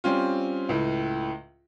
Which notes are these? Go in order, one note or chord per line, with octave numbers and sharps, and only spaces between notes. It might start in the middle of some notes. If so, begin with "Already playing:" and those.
G3 C4 C#4 F4
C#2 A2